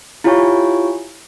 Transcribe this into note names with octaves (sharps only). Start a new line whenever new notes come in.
E4 F4 G4 C#5 G#5 C#6